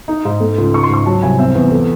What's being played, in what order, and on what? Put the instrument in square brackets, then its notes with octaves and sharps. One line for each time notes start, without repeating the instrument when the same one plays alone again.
[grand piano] D#4
G#2
A3
C#2
D#4 C#6
C6
G#2 C#6
F#3 A5
C2 G#5
C4 E5
E2
A4